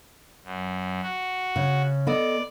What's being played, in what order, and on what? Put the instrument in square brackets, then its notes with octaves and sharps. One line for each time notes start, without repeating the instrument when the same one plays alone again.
[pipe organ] F#2
F#4
[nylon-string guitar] C#3
[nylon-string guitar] B3 A4 D#5 [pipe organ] D5